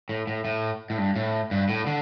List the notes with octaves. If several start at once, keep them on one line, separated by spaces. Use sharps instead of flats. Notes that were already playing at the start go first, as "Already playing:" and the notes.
A2
A2
A2
A2
G2
A2
G2
A2
D3